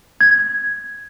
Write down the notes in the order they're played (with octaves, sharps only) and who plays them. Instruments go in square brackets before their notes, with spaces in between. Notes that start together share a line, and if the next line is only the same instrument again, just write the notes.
[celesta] G#6